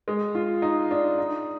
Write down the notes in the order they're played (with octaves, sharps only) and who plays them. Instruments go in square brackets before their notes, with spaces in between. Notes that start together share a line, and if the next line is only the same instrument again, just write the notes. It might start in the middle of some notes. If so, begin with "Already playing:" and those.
[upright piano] G#3
F4
D#4
D4
D#4